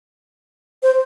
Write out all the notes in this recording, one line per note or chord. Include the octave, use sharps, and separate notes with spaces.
C5